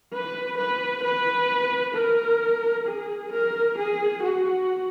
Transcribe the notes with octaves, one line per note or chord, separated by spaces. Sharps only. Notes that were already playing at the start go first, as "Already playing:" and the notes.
B4
B4
B4
A#4
G#4
A#4
G#4
F#4